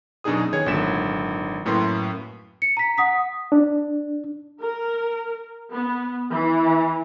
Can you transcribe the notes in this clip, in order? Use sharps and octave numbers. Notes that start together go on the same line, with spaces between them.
F#2 B2 D4 D#4 G#4 D#6
D#3 B3 G#4 C#5 G#6
G#1 A#2 D3 F#3 B6 E7
F#2 A2 A#3 B4 C6
C#7
A#5 B6
F#5 D#6 B6
D4
A#4
B3
E3